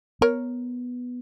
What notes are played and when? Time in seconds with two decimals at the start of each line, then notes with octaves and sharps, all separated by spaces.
0.21 B3 A#4 C#5